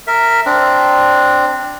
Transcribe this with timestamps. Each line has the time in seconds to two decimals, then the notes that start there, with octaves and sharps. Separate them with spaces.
0.07 A#4 E5
0.46 C4 D4